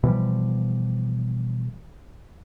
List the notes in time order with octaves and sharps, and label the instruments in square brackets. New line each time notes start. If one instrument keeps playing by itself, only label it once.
[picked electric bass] B2 E3 F3 G3